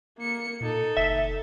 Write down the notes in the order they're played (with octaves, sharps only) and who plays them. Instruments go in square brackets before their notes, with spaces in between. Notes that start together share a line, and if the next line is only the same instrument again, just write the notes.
[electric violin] A#3 C#7
[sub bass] A#2 [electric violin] D#4 A4
[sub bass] F#1 [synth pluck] E5